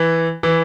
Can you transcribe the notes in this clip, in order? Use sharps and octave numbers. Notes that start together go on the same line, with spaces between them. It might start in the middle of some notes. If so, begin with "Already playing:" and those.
Already playing: E3
E3